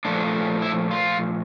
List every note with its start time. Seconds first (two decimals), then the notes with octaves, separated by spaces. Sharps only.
0.05 A#2 F3 A3 D4
0.62 E4
0.91 F4